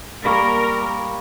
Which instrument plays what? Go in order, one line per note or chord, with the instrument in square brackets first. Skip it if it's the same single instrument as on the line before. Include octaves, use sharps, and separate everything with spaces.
[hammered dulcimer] G3 A#3 [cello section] A#4 [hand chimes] B5 C#6